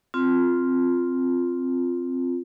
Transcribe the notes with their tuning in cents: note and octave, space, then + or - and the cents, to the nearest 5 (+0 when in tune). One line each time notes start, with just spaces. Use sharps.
C4 +0 F4 +0